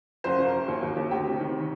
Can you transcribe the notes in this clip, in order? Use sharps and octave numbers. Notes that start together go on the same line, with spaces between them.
F#1 C5
F#1
A#4
F#1
D#2
D#2
D#2
D2 G4
C3
D#3